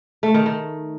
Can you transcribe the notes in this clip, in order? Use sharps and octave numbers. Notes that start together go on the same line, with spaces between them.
A3
D#3
D#3